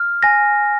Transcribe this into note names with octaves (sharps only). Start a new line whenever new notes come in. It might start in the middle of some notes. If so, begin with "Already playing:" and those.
Already playing: F6
G#5 A#6